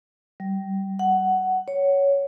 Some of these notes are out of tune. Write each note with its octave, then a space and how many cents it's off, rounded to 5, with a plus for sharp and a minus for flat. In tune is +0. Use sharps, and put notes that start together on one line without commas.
G3 -20
F#5 +10
C#5 +10